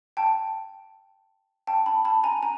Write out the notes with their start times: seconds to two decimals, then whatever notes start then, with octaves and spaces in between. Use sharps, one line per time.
0.17 G5 A5
1.67 G5 A5
1.86 A5 B5
2.05 A5 B5
2.24 G#5 A#5
2.43 G#5 A#5